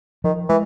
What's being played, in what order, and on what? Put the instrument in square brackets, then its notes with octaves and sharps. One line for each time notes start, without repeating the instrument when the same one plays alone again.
[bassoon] D#3 [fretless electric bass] F3
[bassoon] E3 [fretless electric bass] G#3